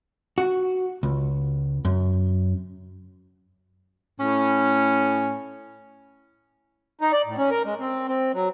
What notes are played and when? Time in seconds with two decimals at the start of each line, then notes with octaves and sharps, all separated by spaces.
0.38 F#4
1.03 C#2
1.85 F#2
4.20 A2 C#4
7.01 D#4
7.13 D5
7.26 A2
7.38 C#4
7.51 A#4
7.65 G#3
7.80 C4
8.08 C4
8.34 F#3